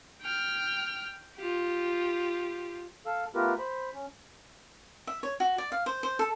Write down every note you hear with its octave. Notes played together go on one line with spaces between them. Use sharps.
G5 F6
F4 G4
A4 F5 E6
A3 B3 F4 G4 A#4 B4
C5 B5
C#4
E5
C#5
F#4
D5
F5
C5
C5
A4